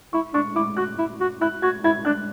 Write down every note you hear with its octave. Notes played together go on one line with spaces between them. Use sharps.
E4 C#6
D4 C#6
E4 D6
F#4 F#6
E4
F#4
E4 F#6
F#4 G#6
E4 G#6
D4 F#6